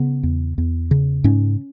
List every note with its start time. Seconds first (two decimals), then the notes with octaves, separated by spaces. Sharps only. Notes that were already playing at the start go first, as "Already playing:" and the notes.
Already playing: C#3 B3
0.23 E2
0.58 E2
0.91 C#3
1.24 G#2 C#4